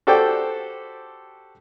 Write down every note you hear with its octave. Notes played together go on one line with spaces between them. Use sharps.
F#4 G4 A4 C5 D5 G5